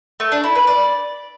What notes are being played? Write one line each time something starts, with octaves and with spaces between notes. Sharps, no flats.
A3
D4
E4
B4
D5